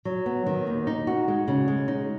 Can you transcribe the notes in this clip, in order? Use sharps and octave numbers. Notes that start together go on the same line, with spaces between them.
F#3
B3
D#3
D#2
D#4
F#4
G#3
C#3
G#3
D#4